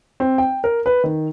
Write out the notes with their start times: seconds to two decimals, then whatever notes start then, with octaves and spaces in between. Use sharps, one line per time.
0.20 C4
0.38 G5
0.64 A#4
0.86 B4
1.04 D#3